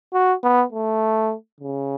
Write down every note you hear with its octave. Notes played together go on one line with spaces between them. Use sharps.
F#4
B3
A3
C#3